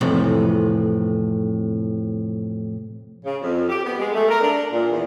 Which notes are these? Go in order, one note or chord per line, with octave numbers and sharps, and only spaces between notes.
F2 A2 C3 E3
C#3
F2
G4
B3
G#3
A3
A#4
D4
A#2
E2